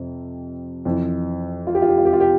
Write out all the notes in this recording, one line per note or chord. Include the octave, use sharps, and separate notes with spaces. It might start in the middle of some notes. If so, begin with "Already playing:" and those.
Already playing: F2 C3
F2 E3
F4
G4
F4
G4
F4
G4
F4
G4